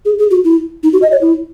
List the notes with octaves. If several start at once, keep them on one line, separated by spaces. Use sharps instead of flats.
G#4
G#4
F#4
E4
D#4
F#4
D#5
C#5
E4